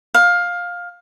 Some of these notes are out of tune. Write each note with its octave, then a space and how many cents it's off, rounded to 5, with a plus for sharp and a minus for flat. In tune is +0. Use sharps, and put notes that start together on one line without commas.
F5 +15